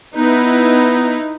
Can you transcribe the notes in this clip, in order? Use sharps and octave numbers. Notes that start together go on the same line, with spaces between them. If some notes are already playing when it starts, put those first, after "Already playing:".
B3 D#4 E4 B4